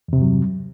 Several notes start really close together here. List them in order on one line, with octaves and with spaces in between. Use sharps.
E2 C3 G2 F#3